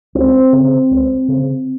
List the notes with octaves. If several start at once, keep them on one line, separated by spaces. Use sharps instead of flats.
C#2 C4
C#3
C#2
C#3